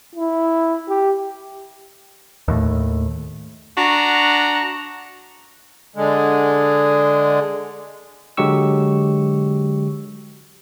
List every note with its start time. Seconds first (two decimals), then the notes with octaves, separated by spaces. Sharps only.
0.16 E4
0.89 G4
2.48 D#2 A2
3.77 D4 F#4 A#5
5.96 D3 G#3
8.37 D3 F#3 G#3 G4 C#6 E6